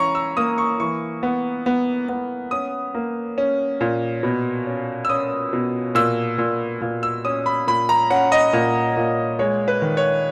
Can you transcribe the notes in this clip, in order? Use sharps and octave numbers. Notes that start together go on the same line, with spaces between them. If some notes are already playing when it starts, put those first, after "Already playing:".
Already playing: E3 C#4 A#5 C#6
E6
A#3 D#6
C#6
E3 C#6
B3
B3
B3
C#4 D#6
A#3
C#4
A#2
B2
C#4
E6
C#4 D#6
B2
A#2 E6
A#2
A#2
E6
C#4 D#6
B5
A#2 B5
A#5
C#4 F#5
D#5
A#2
A#2
G#3 C#5
B4
D#3
C#5